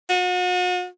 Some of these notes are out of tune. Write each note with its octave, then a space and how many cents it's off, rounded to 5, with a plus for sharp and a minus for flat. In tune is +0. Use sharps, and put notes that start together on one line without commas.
F#4 -40